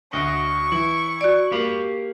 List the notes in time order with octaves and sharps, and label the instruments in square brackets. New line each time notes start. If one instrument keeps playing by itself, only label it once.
[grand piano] D2 [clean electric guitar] F#4 D#5 [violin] C#6
[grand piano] E3 [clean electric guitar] E4
[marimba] F#4 D5
[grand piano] A#3 [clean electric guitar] G4 F5 B5